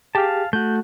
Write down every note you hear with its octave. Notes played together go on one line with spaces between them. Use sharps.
G4 G#4 F5 A5
A3 F#4 G6